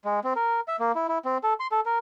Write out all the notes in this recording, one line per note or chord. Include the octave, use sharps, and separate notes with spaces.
G#3
C4
A#4
E5
A#3
E4
E4
C4
A4
C6
A4
A#4